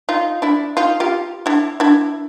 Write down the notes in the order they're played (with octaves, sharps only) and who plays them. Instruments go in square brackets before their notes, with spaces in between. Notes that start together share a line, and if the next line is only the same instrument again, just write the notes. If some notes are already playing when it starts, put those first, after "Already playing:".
[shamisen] D#4 F4
D4 E4
D#4 F4
F4 G4
D4 E4
D4 E4